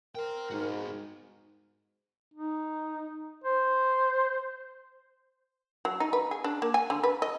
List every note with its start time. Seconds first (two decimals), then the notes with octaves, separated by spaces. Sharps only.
0.15 A#4 C5 G5
0.51 G#2 D#4 F#4
2.34 D#4
3.44 C5
5.85 F#3
6.00 D#4
6.13 B4
6.31 G#4
6.44 D4
6.62 A#3
6.74 G#5
6.90 D3
7.03 B4
7.22 D#5